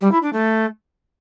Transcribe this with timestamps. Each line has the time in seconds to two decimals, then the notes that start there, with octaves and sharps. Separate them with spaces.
0.01 G3
0.12 E4
0.22 D4
0.33 A3